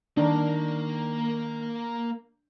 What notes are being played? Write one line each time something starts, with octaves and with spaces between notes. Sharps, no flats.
D#3 A#3 D4 A#4